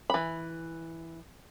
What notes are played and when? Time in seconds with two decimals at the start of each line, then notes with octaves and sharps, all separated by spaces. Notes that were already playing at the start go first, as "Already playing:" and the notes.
0.10 E3 B5